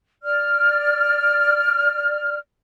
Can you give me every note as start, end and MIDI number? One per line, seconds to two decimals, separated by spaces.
0.23 2.36 74
0.23 2.36 89